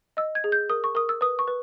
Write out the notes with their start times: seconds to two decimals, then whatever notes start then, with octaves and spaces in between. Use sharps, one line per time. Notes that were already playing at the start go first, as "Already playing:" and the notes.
0.17 D#5 E6
0.35 G#6
0.44 G#4
0.52 G6
0.69 A#4 D#6
0.84 C#6
0.95 A#4 D#6
1.09 E6
1.21 B4 D#6
1.39 C#6
1.48 B4